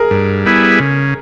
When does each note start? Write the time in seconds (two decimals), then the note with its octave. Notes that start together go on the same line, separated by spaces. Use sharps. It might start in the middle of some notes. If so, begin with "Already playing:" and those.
Already playing: G#4 A#4
0.11 G2
0.45 G3 B3 E4 G#4
0.80 C#3